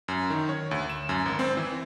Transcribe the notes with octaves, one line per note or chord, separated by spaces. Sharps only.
F#2
D#3
C#5
D2
E7
F#2
G#1
C4
E3